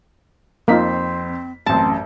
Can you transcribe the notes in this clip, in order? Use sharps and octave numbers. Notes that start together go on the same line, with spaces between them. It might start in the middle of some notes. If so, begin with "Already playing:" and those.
F2 A#3 C4 D#4 F4 B6
A1 F#2 C4 A5